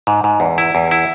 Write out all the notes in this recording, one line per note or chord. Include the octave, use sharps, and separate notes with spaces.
G#2
G#2
E2
E4
E2
E4